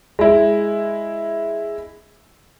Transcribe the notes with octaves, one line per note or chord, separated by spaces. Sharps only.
G#3 E4